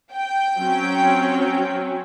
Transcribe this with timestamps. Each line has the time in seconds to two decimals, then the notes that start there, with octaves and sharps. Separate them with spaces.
0.14 G5
0.58 F#3 C4 C#4